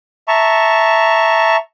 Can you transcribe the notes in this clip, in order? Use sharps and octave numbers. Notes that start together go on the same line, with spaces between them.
E5 A5 A#5 C#6